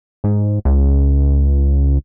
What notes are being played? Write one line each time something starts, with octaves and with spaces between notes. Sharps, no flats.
G#2
C#2